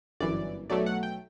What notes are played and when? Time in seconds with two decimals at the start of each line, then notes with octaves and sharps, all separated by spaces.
0.20 G1 F#2 E3 D5
0.70 B1 B2 F#3 A3 D5
0.86 F#5
1.03 G5